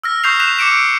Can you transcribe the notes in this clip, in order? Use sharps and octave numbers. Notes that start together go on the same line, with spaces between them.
E6 F6 A#6
C#6 D#6 G6 A#6 C7 F7
F#6 G6 B6 E7 F7
D6 C#7 D7 E7
E6